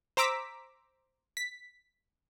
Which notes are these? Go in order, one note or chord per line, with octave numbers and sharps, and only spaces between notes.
C5 A#5 D6 E6 B6
B6